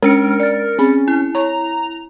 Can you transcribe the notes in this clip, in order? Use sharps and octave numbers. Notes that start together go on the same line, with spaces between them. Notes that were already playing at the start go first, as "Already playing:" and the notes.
G#3 C#4 D4 A#4 C#7
D5 A6 C#7
C4 C#4 G#4 B5
E4
C#5 A#5 C#6